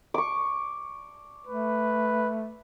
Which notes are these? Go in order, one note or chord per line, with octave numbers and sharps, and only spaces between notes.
C#6 D6
A3 B4